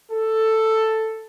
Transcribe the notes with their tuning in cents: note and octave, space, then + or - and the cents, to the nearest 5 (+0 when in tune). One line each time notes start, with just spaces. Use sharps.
A4 +5